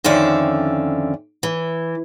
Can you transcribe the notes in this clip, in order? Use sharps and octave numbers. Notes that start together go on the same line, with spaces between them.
F2 D3 D#3 C#4 D5 E5
E3